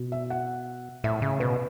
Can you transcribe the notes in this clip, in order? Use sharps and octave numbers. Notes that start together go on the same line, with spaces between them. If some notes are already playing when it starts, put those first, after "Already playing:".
Already playing: B2
E5
F#5
A2 E5
C#3
B2 B4